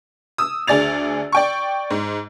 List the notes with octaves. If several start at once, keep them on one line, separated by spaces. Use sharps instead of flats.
D#6 E6
D2 G#4 D5 A6 F7
D5 G5 C#6
G#2